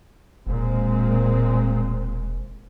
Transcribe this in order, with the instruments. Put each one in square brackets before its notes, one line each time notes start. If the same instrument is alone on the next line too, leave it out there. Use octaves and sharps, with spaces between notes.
[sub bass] E1 [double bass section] A#2 G#3 C4